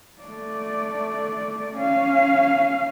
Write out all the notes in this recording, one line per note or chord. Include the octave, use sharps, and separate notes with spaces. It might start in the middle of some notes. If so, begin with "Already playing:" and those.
A3 D5
C#4 F5